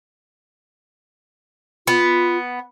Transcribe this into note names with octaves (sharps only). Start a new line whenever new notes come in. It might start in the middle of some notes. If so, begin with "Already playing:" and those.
B3 F4